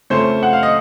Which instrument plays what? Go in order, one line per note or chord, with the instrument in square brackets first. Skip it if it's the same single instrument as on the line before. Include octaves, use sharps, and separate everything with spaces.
[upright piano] F2 C#3 A3 C#4 [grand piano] C5
[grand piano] F#5
F5
D#5